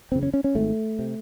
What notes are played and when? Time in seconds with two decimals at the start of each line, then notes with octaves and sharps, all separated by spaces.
0.12 F#1 E2 C#3 C4
0.23 C#4
0.34 C#4
0.44 C#4
0.55 G#1 G#2 A3
0.99 C3